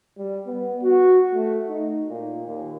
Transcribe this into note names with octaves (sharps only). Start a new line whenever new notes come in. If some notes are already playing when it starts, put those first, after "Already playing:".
G3
B3
F#4
A3
D#4
A#2
D#2